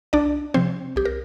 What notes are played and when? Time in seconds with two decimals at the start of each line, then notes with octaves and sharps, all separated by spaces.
0.13 C2 D4 D5
0.54 C3 F3 C4 C5
0.96 C2 G4
1.05 A#4